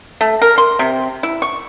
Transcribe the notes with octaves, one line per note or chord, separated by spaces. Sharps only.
A3
A#4
C6
C3
E4
C#6